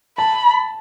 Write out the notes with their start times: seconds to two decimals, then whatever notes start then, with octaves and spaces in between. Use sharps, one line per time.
0.18 A5 B5